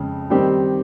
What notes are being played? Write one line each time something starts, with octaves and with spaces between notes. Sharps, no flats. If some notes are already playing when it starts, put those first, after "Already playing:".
Already playing: F2 C#3 G#3
D#3 G3 C4 D#4 G4